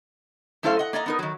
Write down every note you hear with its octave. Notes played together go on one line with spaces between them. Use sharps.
F#2 A3 E4 A4 C5 F5
D#5 F#5
A#3 D5 D#5 A#5
B3 D#4 A#4
D#3 F#3